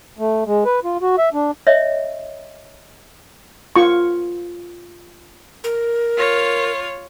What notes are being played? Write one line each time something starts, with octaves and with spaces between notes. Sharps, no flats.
A3
G#3
B4
F4
F#4
E5
D4
C#5 D#5 E5
F4 C#6
A#4
F4 C#5